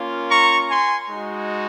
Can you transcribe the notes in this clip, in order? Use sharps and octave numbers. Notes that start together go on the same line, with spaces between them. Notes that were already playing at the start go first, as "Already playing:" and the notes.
Already playing: A#3 C#4 F4
A#5 C#6
G#5 C6
G#3 D#4 F#4